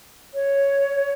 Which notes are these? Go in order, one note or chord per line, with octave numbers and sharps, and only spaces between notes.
C#5